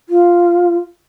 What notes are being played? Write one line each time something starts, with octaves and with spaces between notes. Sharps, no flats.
F4